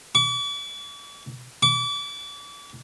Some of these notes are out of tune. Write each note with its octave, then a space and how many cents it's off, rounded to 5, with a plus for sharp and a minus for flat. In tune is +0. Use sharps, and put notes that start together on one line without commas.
D6 -45
D6 -35